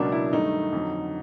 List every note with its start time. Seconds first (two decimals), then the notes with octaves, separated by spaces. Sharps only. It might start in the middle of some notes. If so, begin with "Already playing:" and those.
Already playing: C#2 B2 F#3 A#3 D4
0.12 E4
0.33 G2 D#3 F#3 A3 D#4
0.72 F2 D3 F#3